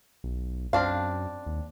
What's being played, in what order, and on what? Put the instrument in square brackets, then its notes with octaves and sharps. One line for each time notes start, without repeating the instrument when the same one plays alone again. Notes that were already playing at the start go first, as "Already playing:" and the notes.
[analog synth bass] B1
[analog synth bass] F#2 [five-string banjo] C4 D4 F5
[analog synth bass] D#2